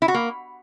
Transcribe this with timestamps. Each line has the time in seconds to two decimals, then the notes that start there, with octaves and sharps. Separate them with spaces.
0.02 E4
0.08 F#4
0.14 A#3